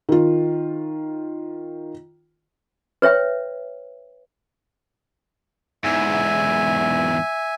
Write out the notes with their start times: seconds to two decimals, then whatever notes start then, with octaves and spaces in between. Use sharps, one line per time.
0.09 D#3 F4
3.02 B4 C#5 E5 G5
5.84 E2 G#2 E5 G#5